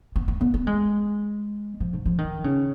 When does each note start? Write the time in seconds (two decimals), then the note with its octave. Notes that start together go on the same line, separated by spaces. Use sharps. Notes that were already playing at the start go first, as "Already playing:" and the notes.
0.16 B3
0.28 B3
0.41 B3
0.54 B3
0.67 G#3
1.80 F3
1.93 G#2
2.06 F3
2.18 D#3
2.44 C#3